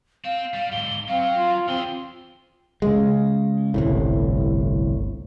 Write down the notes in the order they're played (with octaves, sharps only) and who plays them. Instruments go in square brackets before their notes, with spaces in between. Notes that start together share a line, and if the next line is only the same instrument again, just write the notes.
[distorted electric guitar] C4 [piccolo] F5
[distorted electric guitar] G3
[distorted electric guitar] G#2 D3 [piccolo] G7
[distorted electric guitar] F#3 [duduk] C4 [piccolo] F5
[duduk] F4
[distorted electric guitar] E3 G#4 [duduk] C4 [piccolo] G7
[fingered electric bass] C#3 G#3
G1 C2 A2